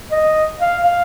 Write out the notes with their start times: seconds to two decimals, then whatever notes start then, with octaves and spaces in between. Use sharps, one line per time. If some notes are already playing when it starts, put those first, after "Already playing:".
0.12 D#5
0.60 F5
0.84 F5